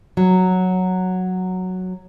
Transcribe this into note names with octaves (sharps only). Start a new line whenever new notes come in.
F#3